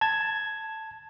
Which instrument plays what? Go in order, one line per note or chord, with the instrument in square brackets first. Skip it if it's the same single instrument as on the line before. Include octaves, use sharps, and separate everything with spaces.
[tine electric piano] A5 G#6